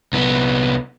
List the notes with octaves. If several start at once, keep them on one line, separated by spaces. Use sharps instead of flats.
C2 B3